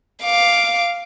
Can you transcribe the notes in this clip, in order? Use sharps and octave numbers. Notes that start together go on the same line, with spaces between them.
F5 D6